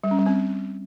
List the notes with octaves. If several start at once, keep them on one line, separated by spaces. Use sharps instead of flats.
G3
C#4
G3
C4